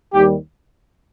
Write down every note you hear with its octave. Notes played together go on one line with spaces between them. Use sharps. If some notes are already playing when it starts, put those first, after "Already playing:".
D#2 D#3 G3 G4